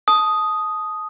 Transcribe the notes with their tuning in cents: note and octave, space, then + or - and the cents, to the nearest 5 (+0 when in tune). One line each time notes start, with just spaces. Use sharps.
A5 -20 D#6 +0